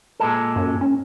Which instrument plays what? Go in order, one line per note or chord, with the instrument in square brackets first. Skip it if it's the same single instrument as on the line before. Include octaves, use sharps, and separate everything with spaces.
[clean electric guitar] A#2 G#3 A4
[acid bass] F#2
C#4